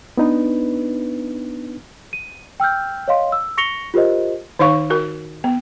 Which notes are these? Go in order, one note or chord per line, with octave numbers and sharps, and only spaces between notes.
B3 D4 D#4 B4
D#7
G5 E6 F6 G6
C#5 D#5 F5 C6
E6
C#6 A#6 C#7 F7 G7
F4 G4 A#4 C5 D#5
D#3 D#4 C#5 F5 C#6
F#4 A#4
B3